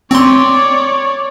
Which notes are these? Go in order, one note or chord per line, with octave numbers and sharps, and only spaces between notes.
C4 C#5 D5 C6